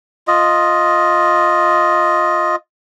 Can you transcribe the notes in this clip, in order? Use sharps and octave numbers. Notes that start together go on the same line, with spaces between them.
F4 D#5